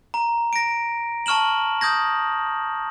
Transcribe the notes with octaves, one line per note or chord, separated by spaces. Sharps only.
A#5
A#6 D7
A5 C#6 F6 E7 F#7
D#6 G6 G#6 A#6